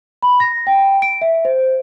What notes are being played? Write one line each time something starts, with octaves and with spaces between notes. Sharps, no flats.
B5
A#6
G5
D7
E5
C5